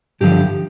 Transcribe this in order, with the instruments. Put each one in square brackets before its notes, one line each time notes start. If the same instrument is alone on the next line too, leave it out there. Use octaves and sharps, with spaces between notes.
[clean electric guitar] G2 D3 F3 G4